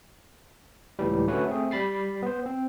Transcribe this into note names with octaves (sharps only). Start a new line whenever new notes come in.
C#2 A2 E3 G3
D3 A3 C#4 F#4 B4 C#5
A3 C4 G#4
G3 B5 A6 C7
B3 C5
C4